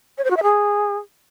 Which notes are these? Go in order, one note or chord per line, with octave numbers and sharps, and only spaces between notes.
C#5
C5
F#4
E5
G#4